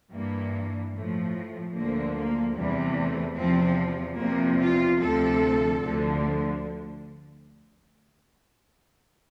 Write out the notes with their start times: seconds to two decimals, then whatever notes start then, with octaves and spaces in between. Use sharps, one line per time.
0.12 G2 E3 A#3
0.93 A2 F3 A3
1.35 A3
1.75 D2 D3 F3 A#3
2.16 A#3
2.56 E2 C3 E3 G3
2.97 A3
3.37 E2 C3 F3 C4
4.19 E2 C3 F3 A#3
4.60 F4
5.01 D2 C3 F3 A4
5.82 D2 D3 F3